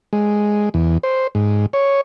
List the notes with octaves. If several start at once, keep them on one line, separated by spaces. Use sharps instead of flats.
G#3
E2
C5
G#2
C#5